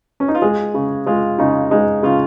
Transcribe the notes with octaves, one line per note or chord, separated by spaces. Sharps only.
C#4
D#4
F4
G#3 G#4
C#3
G#3 F4
C#3 D#4
G#3 D#4
C#3 F4